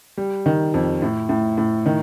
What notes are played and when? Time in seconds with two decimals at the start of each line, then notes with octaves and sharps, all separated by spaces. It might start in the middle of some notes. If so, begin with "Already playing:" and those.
0.17 G3
0.46 D#3
0.74 F2
1.02 A2
1.29 A2
1.58 A2
1.86 D#3